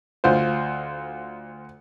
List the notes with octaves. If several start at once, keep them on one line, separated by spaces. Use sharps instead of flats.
D2 F4 C5